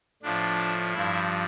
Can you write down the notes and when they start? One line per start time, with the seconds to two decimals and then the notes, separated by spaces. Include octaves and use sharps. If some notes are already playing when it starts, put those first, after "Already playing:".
0.22 A2 F3 D4
0.94 G2 F3 E4